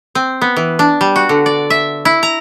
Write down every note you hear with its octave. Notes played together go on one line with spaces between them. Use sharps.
C4
B3
E3
D4
G3
F#4
D3
D5
E5
E4
A#5